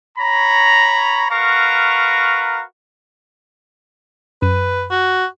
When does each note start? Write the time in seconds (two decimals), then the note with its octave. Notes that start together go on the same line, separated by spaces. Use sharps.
0.18 C#5 A#5 B5
1.31 F#4 A#4 B4 F5 A#5 C#6
4.42 F#2 B4 D#7
4.91 F#4